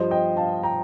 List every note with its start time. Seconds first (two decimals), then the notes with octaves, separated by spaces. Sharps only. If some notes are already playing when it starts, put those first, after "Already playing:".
Already playing: G2 F3 C5 D#5
0.11 D#5 G5
0.37 F5 A5
0.63 G5 A#5